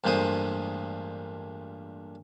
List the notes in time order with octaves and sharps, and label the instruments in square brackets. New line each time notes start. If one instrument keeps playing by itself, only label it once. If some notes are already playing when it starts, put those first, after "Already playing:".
[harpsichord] A1 G2 A#2 G#3 C5 D#6